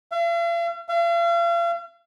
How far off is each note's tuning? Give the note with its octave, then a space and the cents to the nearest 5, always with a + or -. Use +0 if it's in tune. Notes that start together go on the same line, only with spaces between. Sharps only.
F5 -45
F5 -40